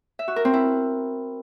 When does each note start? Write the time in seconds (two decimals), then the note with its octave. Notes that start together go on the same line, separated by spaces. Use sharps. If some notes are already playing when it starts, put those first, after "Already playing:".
0.19 E5
0.28 F#4
0.36 A#4
0.45 C4
0.54 E4